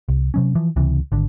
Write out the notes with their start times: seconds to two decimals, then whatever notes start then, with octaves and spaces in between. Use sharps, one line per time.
0.09 C2
0.34 C3 F#3 C#4
0.55 E3 F3
0.76 C#2 C3 E3
1.12 G#1 D3